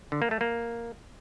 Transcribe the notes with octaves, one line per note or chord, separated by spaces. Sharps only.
D3
A#3
A3
A#3